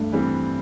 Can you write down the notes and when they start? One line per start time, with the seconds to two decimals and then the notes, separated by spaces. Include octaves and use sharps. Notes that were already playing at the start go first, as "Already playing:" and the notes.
Already playing: G2 A3
0.12 E3 G3 C4